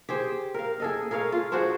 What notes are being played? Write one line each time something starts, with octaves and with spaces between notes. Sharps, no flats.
G4 G#4 C5
A#4 F5
G#4 A4 D#5
G#4 A#4 C#5 F5
F4
D4 F#4 G#4 C5